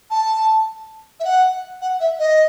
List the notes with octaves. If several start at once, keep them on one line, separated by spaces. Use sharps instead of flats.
A5
E5
F#5
F#5
E5
D#5